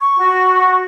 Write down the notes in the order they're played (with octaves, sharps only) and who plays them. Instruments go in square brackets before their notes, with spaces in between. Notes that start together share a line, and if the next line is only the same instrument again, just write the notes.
[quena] C#6
[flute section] F#4